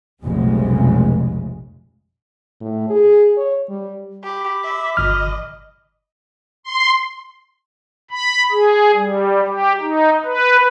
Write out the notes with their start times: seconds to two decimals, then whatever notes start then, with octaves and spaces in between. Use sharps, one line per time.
0.24 F1 B1 C#3 G#3
2.61 A2
2.90 G#4
3.37 C#5
3.69 G3
4.24 G4 B5 D6
4.64 E5
4.97 G1 D#5 F6
6.63 C6
8.11 B5
8.52 G#4
8.95 G3
9.47 G4
9.80 D#4
10.25 B4